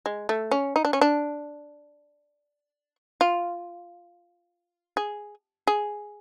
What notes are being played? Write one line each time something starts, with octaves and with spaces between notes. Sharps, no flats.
G#3
A3
C#4
D#4
D4
C#4
D4
F4
G#4
G#4